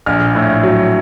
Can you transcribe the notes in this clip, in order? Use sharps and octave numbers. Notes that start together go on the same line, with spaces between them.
A#1 F6
A2
F#3